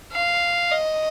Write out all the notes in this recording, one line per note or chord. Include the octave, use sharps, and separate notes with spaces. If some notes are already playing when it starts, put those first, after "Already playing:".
F5
D#5